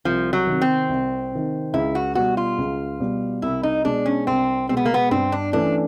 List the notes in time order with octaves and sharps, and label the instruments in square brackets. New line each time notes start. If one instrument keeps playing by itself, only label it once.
[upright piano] C2 [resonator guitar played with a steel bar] F3
[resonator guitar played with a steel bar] F#3
[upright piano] C3 D#3
[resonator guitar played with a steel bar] C4
[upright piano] C2
C3 D#3
[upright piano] C#2 [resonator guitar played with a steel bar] E4
[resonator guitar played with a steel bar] F#4
[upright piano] B2 G3 [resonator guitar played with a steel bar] F#4
[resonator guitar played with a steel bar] F4
[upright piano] C#2
B2 G3
[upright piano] C2 [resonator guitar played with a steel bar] E4
[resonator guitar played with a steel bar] D#4
[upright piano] B2 G#3 [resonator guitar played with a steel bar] D4
[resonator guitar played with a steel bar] C#4
[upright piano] C2 [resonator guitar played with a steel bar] C4
[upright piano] B2 G#3 [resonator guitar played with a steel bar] C4
[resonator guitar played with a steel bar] B3
A#3
B3
[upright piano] G2 [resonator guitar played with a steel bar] C4
[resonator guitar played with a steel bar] D4
[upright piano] E3 A3 C#4 [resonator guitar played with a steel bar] D4